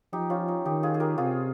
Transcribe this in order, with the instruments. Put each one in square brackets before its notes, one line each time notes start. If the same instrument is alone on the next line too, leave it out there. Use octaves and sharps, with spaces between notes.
[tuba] F3 [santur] D#4 G4
[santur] C#4 F4
D#4
[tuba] D#3 [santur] D#4 G4
[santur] F4 G#4
G#4
G4 A#4
[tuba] C3 [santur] F4 G#4